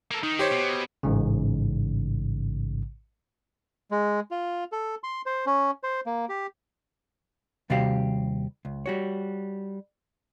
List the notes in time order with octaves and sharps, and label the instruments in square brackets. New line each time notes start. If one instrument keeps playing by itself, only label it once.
[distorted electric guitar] A#3 A4
[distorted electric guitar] D#3 [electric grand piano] D#4
[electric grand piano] G4 C5 C#5
[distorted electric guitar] B2
[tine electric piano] A1 G#2 C#3
[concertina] G#3
F4
A4
C6
C5
C#4
C5
A#3
G4
[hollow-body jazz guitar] D#2 C3 G3 F#4 G4 F5
C#2
G3 F#4 C#5